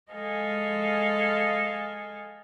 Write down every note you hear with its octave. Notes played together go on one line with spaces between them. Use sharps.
G#3 A4 D#5 F5 G#5